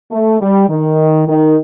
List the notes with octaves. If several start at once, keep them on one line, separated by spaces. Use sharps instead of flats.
A3
G3
D#3
D#3